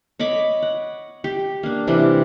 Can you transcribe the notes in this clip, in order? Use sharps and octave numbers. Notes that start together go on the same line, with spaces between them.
C#5 D#5 B5 D6
F#5
G4
A#3 D4
C3 E3 G3 D4